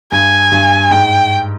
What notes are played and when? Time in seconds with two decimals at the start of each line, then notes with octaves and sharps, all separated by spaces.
0.12 G2 G#5
0.52 G2
0.91 G#2 G5